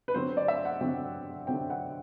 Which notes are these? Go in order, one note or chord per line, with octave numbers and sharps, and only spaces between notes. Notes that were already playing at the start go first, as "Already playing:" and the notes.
B4
D3 F#3 C4 C5
D5
E5
F#5
D3 F#3 C4 G5
D3 F#3 C4 G5
F#5